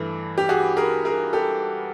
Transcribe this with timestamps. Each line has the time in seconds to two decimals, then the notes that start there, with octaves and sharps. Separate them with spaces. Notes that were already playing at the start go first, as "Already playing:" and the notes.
Already playing: G2 E3 A3
0.38 G4
0.49 F#4 G#4
0.77 G#4 A#4
1.05 G#4 A#4
1.33 G4 A4